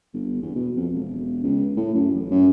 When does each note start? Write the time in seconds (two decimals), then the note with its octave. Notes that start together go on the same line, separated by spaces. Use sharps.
0.14 G1
0.42 E2
0.55 B2
0.76 F2
0.93 E1
1.43 C#2
1.77 A2
1.95 F#2
2.14 A1
2.30 F#2